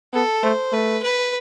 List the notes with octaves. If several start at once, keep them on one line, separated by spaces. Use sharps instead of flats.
B3 A4
A3 C5
A3 B4
B4